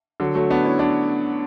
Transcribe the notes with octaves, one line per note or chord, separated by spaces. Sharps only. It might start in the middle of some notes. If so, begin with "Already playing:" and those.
D3 F#3
F#3 A3
B3 D4
C#4 E4
B3 D4